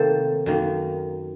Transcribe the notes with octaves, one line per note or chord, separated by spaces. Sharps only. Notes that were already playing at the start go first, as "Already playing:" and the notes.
Already playing: C3 D#3 A#3 A4 C5
F#2 D#3 A#3